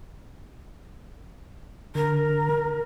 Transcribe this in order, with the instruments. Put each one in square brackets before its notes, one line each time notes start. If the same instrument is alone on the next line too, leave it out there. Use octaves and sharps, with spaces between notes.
[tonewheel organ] D3 [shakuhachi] A#4